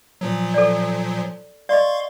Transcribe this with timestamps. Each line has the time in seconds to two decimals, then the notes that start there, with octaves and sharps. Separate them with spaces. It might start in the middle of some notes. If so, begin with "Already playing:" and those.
0.21 A#2 F3 F#3
0.54 A4 D5
1.69 D5 D#5 F5 C6 C#6